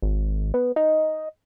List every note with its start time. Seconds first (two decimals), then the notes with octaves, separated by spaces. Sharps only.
0.02 G#1
0.54 B3
0.76 D#4